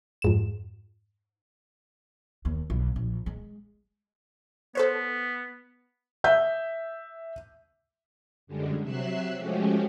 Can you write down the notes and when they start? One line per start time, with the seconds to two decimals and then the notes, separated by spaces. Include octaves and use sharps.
0.22 F2 G#2 E7
2.45 D#2
2.70 B1
2.96 A#1
3.26 G#3
4.75 B3 A4 C5 C#5
6.24 E5 G6
8.47 F#2 D3 G3 G#3
8.82 C3 F#3 E5 E6 F#6 C7
9.37 F3 G#3 A3 C#4 F#4 G4